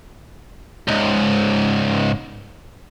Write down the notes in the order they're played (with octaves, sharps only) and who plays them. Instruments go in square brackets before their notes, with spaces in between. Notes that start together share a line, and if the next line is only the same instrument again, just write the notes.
[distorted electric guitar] C#2 G#2